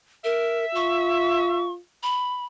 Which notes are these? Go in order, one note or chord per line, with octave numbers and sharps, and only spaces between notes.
A#4 E5
F4 C#6
B5